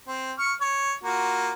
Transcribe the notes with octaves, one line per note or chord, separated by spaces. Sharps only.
C4
C#6 F6
C#5
A#3 F4 F#4